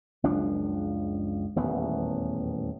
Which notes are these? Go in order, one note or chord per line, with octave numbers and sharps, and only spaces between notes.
F#1 C#2 F3 D4
D#1 A1 E2 B3